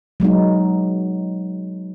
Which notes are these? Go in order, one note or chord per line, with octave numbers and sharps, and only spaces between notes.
F#3 G#3 B3 D#4